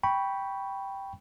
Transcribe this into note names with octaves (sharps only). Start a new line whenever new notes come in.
G5 B5 C#6